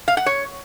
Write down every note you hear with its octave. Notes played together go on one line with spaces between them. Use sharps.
F5
F#5
C#5